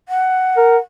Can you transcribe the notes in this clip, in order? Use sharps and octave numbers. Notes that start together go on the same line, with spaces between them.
F#5
A#4